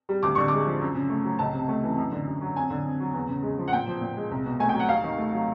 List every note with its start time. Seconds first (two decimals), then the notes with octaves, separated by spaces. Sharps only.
0.09 G3
0.23 D2 D6
0.35 D3 C#6
0.48 G#3 D6
0.66 F3
0.81 F#2
0.95 C#3
1.10 A3
1.24 F#3
1.39 C#2 A5
1.53 C3
1.69 A3
1.84 E3
1.98 F#2
2.12 D3
2.27 F#2
2.41 F#3
2.56 F2 G#5
2.70 D3
2.86 F2
3.00 F#3
3.14 E2
3.29 C#3
3.43 G#3
3.58 F3
3.68 F#5
3.73 A#2 G5
3.88 F3
4.01 A#2
4.17 G#3
4.31 C2
4.46 B2
4.60 A3 G#5
4.69 F#3 G5
4.80 F#5
4.88 D#2 F5
5.04 D#3
5.18 A3
5.32 F#3